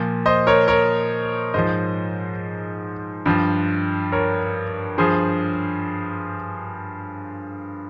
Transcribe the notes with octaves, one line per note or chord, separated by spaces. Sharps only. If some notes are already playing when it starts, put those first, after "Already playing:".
Already playing: A#2 F3
C5 D#5
A#4 C#5
A#4 C#5
G#2 F3 C5 D#5
G2 F3
A#4 C#5
G2 F3 G#4 C5